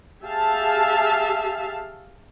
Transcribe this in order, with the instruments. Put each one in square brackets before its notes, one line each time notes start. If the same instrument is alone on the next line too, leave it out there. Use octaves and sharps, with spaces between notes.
[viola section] G4 G#4 E5 F5 A5